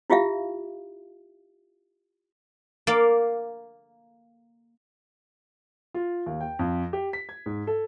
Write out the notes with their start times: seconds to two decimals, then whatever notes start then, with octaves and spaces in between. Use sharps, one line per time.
0.10 E4 F4 G4 E5 F5
2.87 A#3 D5 F5
5.94 F4
6.26 D#2
6.41 G5
6.59 F2
6.93 G4
7.13 B6
7.29 G#6
7.46 G#2
7.67 A4